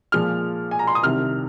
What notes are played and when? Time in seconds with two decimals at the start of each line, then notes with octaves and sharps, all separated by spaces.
0.12 A#2 F3 G#3 F6
0.71 G#5
0.79 A#5
0.87 C6
0.95 D#6
1.03 C2 C3 D#3 F6